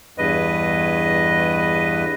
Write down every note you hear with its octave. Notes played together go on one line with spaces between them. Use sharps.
E2 G2 B4 D#5